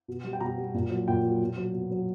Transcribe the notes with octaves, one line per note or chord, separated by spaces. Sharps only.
B2
G3
G5
B2 A#5
G3
A#2
F#3
A#2 G5
F#3
B2
F#3
B2
F#3